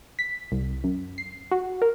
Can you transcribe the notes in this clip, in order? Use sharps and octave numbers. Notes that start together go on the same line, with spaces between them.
B6
C2
F#2
C7
F#4
A#4